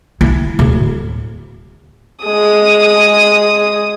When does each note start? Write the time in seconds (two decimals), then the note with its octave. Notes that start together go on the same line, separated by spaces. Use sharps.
0.21 E4
0.59 D1
2.24 G#3 D#6